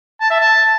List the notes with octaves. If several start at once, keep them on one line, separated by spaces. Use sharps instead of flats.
A5
E5
A5